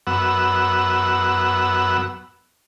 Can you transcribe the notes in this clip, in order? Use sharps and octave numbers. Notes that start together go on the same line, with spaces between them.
F#2 B3 F#5 E6